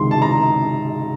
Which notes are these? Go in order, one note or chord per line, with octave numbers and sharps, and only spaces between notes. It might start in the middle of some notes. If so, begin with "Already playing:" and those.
Already playing: C#2 C3 D#3 C6
A5
A#5